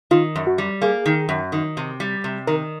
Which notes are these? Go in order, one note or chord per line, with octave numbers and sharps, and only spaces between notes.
D#3 F4
F#2
F#4
G3
A#3 G#4
D#3
F#2
D#3
C3
G3
C3
D#3 A#4